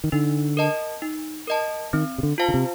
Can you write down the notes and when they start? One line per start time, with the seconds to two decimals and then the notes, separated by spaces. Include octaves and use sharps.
0.04 D#3
0.12 D3 D#4
0.57 A#4 D#5 A5
1.02 D#4
1.47 A#4 D#5 A5
1.93 D#3 C4
2.18 C3
2.23 D3
2.38 F4 C5 F5 A5
2.48 D3
2.54 C3